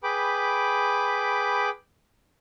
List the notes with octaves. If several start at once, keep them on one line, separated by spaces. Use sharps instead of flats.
G#4 B4 G5 B5 D6